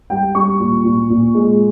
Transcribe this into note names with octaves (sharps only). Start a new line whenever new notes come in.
G3 G5
G3 C#6
A#2
A#2
A#2
G#3